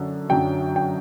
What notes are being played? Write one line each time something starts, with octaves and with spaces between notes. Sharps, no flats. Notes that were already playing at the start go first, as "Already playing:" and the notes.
Already playing: F#2 D3 F#3
F#2 D3 F#3 G5
G5